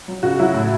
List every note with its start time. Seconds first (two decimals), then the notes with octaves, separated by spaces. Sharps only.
0.08 F#3
0.23 C#3 F#4
0.39 F#3 E4
0.54 A2